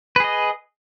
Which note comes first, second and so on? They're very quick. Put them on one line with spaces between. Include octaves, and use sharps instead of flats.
B4 G#4 D#5